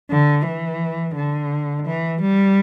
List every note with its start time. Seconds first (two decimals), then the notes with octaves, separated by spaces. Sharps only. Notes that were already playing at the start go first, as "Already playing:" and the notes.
0.10 D3
0.46 E3
1.16 D3
1.86 E3
2.21 G3